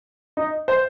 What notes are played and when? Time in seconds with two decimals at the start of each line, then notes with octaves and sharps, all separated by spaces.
0.37 D#4
0.68 C5